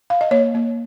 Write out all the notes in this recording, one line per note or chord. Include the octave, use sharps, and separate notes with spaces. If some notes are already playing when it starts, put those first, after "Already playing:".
F5
D#5
A#3 C#5
A#3